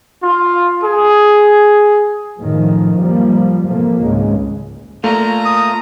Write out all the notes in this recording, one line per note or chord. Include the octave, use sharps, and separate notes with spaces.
F4
G#4
F#2 A2 D#3 F3
F3 G3 A#3
G#2 C3 F3 A3 A#3
G#1 C#2 C#3 G#3
A3 A#3 F4 A#5
D#6